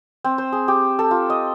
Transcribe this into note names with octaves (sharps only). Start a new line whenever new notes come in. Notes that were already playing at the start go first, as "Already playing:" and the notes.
C4
C5
G#4
G4
A4
F4
D#5